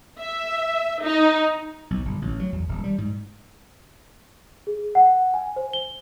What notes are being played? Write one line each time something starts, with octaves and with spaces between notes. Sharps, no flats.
E5
D#4
B1
G1
A1
F#3
E2
D#1
G3
G#2
G#4
F#5
G#5
C5
G7